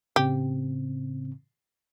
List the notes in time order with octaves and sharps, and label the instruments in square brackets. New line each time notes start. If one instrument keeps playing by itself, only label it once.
[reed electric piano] A2 C#3 C4 [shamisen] G4